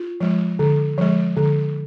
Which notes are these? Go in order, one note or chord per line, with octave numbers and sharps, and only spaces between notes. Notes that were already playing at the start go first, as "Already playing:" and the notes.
Already playing: F4
F3 G#3
D3
F3 G#3
D3